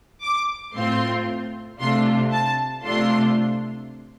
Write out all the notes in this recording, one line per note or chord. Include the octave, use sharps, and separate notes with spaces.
D6
A2 A3 C4 F4 C6
C3 A3 D4 F4 C6
A5
C3 A3 D4 F4 C6